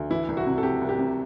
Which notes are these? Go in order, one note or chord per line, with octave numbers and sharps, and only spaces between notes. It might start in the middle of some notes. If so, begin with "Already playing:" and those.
Already playing: D2
E3 E4
C2
F#4
C3
A4
C3 G4
C2
G4
C3